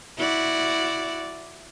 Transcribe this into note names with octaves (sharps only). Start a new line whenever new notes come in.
E4 F#4 D5